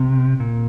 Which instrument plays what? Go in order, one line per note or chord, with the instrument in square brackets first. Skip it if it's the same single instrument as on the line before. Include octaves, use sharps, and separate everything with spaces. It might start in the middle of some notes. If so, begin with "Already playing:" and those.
Already playing: [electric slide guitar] C3
A#2